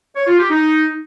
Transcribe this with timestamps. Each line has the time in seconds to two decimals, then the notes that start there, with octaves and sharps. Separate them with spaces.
0.16 C#5
0.27 F4
0.39 G4
0.50 D#4